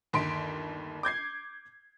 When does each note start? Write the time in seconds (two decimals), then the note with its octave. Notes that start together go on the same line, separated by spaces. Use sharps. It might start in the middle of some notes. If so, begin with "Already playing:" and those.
0.13 G1 D#2 C6 B6 D7
1.03 D6 G6 G#6 C7